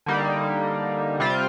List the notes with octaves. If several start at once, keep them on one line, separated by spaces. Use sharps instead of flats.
D3 G3 A#3 D#4
C3 G3 C4 F4